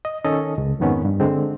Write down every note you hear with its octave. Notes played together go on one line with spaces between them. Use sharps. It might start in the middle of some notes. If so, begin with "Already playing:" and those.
D#5
D#3 C#4 A4 D#5
C#2
F2 G#2 D#3 B3 C#4
G2
D3 G#3 C4